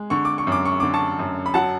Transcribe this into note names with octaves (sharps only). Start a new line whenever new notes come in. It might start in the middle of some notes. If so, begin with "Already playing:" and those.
Already playing: G#3
D3 C#6
D6
C#6
F#2
D6
C#6
D3 D6
A5 C#6
F#2
B5
F#3 F#5 A5